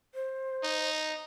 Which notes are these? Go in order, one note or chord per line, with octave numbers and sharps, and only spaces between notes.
C5
D#4